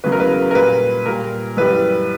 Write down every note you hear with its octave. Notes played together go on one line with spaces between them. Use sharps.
E2 C#3 F#3 B4
A#4
B4
A#4
A#2 G3 B4
A#2 G3 A#4
F#2 E3 G3 B4